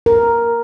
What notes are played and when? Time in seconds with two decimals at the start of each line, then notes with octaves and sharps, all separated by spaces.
0.06 A#4